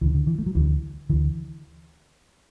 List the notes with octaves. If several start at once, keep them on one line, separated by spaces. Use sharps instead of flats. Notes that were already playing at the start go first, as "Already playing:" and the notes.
D2 D3 E3
D3
E3
A3
F#3
D2 D3 E3
D2 D3 E3